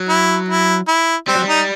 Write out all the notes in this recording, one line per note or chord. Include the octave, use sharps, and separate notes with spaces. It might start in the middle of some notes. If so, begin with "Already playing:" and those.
Already playing: F#3
E4
E4
E4
G3 C4
F#3
G3
D#4